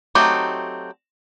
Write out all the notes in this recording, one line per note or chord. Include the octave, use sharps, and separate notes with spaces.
F#3 A3 C4 D#4 G4